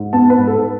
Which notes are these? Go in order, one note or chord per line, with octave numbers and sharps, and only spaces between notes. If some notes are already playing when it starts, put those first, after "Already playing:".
Already playing: G#2
B3 A5
B4
G#2
A4